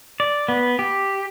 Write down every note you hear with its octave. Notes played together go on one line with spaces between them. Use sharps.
D5
B3
G4